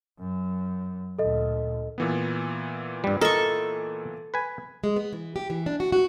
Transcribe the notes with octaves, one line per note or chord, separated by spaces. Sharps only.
F#2
D2 A#2 A4 D#5
A#2 E3 B3
G2 G3
A4 A#4 D#5 C#6
B4 G#5
G#3
B3
E3
G4
E3
D4
F#4
F#4